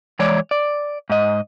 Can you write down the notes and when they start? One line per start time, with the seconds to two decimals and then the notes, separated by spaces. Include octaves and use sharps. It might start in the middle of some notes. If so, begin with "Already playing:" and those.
0.19 E3 G#3 C#5 D5
0.51 D5
1.10 G#2 D#5